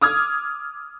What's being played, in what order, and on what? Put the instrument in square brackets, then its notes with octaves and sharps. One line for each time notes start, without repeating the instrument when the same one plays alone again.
[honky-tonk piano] D6 D#6 F6 G#6